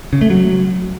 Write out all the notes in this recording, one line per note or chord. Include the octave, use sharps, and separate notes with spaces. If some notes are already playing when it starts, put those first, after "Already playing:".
C#3
A3
F#3